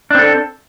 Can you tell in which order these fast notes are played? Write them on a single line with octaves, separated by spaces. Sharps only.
D4 C4 A4